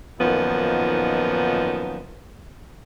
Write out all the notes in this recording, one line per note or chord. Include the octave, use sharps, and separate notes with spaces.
F#2 A#2 D#3 F3 B3 D#4